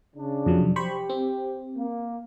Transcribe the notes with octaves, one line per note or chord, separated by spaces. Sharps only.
C#3 D4
F2 C3 F#3
G4 C5 B5 C#6
C4
A#3